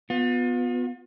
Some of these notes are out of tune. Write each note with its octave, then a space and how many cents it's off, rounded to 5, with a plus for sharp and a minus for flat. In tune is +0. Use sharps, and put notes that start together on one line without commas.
B3 +5 F4 +40